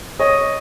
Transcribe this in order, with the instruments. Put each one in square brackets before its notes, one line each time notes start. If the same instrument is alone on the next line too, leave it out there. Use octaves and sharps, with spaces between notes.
[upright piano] C#5 [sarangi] D#5